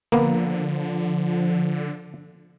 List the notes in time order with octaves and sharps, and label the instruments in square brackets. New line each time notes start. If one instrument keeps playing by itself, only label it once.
[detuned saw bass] D3 [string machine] F3 [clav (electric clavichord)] A#3 B3